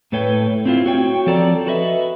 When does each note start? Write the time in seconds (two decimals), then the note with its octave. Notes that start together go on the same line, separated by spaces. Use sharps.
0.12 A2 A3 A4 B4 C#5 G5
0.66 C4 E4 F4
0.86 F#4 C#5 G5
1.27 F3 C4 A4 D5 A#5
1.66 F#4 A4 B4 D#5 E5